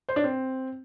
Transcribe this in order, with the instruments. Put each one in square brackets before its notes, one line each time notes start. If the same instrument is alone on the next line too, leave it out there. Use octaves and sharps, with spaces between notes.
[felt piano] C5
D4
C4